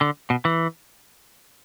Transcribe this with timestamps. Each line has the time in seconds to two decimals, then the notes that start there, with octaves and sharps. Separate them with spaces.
0.01 D3
0.30 B2
0.45 E3